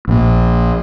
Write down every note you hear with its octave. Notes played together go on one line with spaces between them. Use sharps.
A#1 A#2